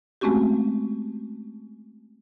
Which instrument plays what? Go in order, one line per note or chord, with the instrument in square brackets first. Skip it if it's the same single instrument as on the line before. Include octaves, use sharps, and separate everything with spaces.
[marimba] G#3 A3 C4 C#4 F#4 G4